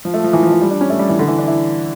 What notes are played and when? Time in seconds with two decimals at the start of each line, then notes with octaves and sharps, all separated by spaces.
0.05 F3
0.14 A3
0.24 F3
0.33 E3
0.43 F3
0.52 E3
0.61 G3
0.71 D4
0.81 C#4
0.90 A3
0.99 G3
1.09 E3
1.19 D3
1.28 E3
1.39 D4
1.48 E4